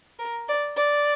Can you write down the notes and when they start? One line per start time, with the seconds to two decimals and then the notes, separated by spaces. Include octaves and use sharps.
0.18 A#4
0.47 D5
0.76 D5